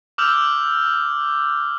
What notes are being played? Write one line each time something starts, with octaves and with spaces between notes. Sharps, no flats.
D6 E6 F6 G6 F7